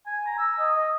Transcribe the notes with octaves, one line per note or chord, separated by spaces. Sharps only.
G#5
A#5
E6
D#5
D#5